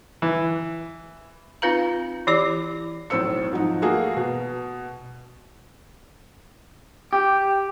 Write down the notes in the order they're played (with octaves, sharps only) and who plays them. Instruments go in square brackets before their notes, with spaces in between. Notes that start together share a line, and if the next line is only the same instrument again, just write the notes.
[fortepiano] E3
[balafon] C4 D#4 F4 B4 F5 A#5
E3 E4 G4 D5 D6
[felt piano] B1 A2 C4 E6 C#7
G#2 F3 F#3 D#4
A3 A#3 F#4 G#4
B2
[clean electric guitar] G4